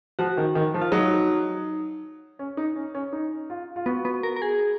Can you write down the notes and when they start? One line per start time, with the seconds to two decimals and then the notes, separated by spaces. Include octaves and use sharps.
0.19 F3 F#4
0.37 D#3
0.55 D#3
0.74 F3
0.81 F4
0.92 F#3 D#4
2.39 C#4
2.57 D#4
2.76 C#4
2.95 C#4
3.13 D#4
3.50 F4
3.76 F4
3.86 B3 F#4
4.05 B3
4.23 A#4
4.36 A#4
4.42 G#4